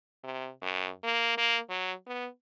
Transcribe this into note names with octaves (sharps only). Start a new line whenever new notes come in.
C3
F#2
A#3
A#3
F#3
B3